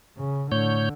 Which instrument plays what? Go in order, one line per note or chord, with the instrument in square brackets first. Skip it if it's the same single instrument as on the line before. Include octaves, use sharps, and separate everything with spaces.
[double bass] C#3
[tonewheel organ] A2 C#5 G6 [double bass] D3